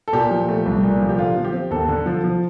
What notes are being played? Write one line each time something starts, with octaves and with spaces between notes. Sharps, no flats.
A4
A#2 G4
F3
A3
C2
A#2
F3
G4
D3 F4
F3
G4
C4
D#2 A4
D3
F3
F3